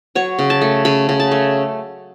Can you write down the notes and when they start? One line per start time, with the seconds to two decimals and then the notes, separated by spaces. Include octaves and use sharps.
0.15 F#3 C#5
0.39 C#3
0.50 A5
0.61 A3
0.85 C#3 B5
1.09 C#3
1.20 A5
1.31 A3